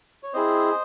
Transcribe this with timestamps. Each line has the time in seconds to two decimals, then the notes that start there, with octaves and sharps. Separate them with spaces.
0.23 C#5
0.33 C4 E4 G#4 C5 D#5